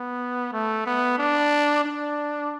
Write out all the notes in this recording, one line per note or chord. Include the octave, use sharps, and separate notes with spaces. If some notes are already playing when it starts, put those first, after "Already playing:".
Already playing: B3
A3
B3
D4
D4